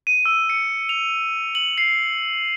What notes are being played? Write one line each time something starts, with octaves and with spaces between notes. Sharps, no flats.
D#7
E6
C#7
F7
F#7
C7